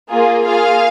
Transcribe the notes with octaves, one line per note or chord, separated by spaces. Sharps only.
A#3 F4 G#4
A#3 F4 G#4 F5